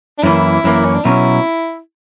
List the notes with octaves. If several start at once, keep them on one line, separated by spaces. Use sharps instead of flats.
D4
F#2 E3 A#3 E4
F#2 E3 A#3
C#4
D4
B2 F#3 C#4 E4